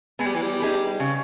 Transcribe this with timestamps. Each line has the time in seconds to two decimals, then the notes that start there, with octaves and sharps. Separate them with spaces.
0.19 G#3 B3
0.26 G3
0.35 E3
0.42 G3
0.60 D#4 G#4 B4
1.00 C#3